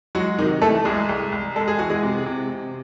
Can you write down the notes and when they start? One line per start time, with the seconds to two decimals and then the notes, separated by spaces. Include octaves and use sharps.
0.15 F#3 G#3 F#4
0.38 C3 D#3 D#4
0.62 E3 A3 A4
0.85 C2 G#3 G#4
1.09 C2
1.32 C2
1.56 G#3 A4
1.68 G#4
1.79 E3 F#4
1.90 G#3 G#4
2.03 C3
2.26 C3
2.49 C3